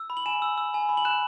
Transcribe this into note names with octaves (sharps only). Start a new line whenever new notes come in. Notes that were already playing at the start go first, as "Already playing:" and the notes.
Already playing: E6
B5
F#7
G#5 E7
E6
E6
G#5
B5
F#7
F#6 E7